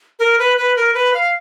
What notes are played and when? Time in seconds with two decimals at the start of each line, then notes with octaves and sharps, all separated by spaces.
0.19 A#4
0.39 B4
0.57 B4
0.76 A#4
0.94 B4
1.14 F5